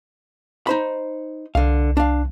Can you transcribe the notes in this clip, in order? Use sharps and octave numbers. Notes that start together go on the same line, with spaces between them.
D#4 C5 B5
C2 D3 F5
D4 F5